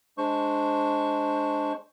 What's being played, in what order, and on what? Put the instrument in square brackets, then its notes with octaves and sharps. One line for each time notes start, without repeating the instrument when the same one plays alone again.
[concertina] G#3 D4 C5 C#6